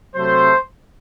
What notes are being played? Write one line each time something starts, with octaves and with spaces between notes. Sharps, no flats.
C3 F#3 A3 C5